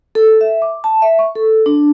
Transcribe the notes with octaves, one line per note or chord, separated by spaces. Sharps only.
A4
E5
D6
A5
E5
C#6
A4
D4